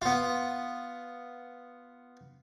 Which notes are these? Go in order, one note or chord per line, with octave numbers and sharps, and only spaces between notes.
B3 F4